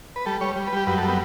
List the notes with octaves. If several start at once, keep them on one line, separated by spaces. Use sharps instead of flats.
B4
G3 A4
G3 C#5
G3
B4
G3 G4
F#2 B4
A4
G3
B3